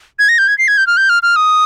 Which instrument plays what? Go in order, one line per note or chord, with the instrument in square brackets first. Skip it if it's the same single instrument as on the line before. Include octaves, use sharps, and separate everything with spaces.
[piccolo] G#6
A#6
G6
G#6
C7
G#6
G6
F6
G6
F6
F6
D#6